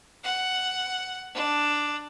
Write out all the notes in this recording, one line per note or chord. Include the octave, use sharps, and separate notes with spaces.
F#5
D4